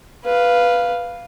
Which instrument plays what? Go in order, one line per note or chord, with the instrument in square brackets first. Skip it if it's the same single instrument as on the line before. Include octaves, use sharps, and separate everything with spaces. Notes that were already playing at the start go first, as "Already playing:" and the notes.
[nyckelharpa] B4 F5